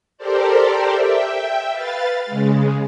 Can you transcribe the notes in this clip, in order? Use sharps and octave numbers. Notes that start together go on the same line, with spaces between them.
G4 A4 A#4 C5 D5
E5 G5
B4 F5 A6
C#3 G#3